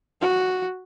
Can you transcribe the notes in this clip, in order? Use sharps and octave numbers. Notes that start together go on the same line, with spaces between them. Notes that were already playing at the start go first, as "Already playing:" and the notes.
F#4